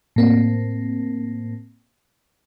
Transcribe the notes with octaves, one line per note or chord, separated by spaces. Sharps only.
A2 A#3 C4